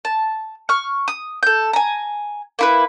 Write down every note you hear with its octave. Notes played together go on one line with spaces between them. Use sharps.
A5
C#6 F6
D#6
A4 G6
G#5 A#5
A#3 E4 B4